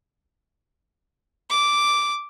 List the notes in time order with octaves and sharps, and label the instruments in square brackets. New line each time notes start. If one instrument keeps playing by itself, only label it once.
[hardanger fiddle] D6